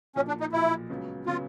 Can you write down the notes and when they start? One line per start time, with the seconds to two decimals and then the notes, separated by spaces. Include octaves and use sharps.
0.16 B1 A#2 F3 C#4
0.28 D4
0.40 D#4
0.52 B1 A#2 F3 E4
0.89 C#2 C#3 F#3 B3
1.26 C#3 F#3 B3 F4